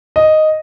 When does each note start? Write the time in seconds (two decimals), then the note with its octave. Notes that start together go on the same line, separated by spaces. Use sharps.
0.16 D#5